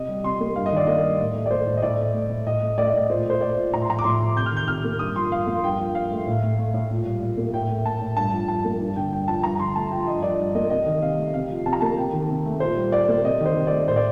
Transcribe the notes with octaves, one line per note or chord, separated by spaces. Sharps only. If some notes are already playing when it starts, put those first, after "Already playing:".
Already playing: C3 D#5
G3
C3 C6
A#3
G2 F5
D#5
D#3 D5
A#3 D#5
G3
A2
A3
D5
A3 C5
A2
D#5
A2 D5
A3
A3
A2
A2 D#5
A3
A3 D5
D#5
A2 D5
A#2 C5
A3 C5
A3 D5
A#2
A2 A#5
C6
F3 A#5
D6
A2 C6
A3
C3 G6
F6
D#3 G6
C3 F6
A#3
G2 D#6
F3 C6
G2 F5
A#3 F5
G2 G5
F3
G2 F5
A3
A2
A3
A3
A2
A#2
G3
A#2
A#3
A2 G5
A3
A3 A5
A2
G2 A5
F3
G2 A5
A#3
G2
D3 G5
G2 G5
F3 A5
G2 A#5
D3 C6
A3 A5
F3 G5
G2 D#5
F3 D5
G2
A#3 D#5
C3 D#5
D#3
C3 F5
A3
C3 F5
F3
C3 A5
A#5
A#3 A5
C3 G5
D#3
C3
A3
A#2 C5
G3
A#2 D5
A#3
C3 D#5
D#3
C5
C3
A3 D5
A2 C5
D5